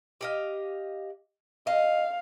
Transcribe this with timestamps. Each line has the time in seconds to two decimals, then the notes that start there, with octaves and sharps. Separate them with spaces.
0.21 G4 D#5 F5
1.67 D#5 F5